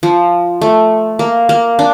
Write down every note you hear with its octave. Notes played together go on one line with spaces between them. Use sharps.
F3
A3
A#3
A#3
D4